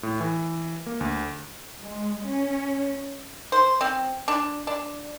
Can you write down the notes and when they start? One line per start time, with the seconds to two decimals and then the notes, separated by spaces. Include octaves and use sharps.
0.03 A2
0.20 E3
0.86 A#3
1.01 D2
1.80 G#3
2.27 C#4
3.52 C5
3.81 C4
4.28 D4
4.67 D4